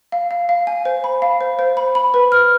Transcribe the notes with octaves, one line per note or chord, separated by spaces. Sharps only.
F5
F5
F5
G#5
C5
B5
F5
C5
C5
B5
B5
B4
F6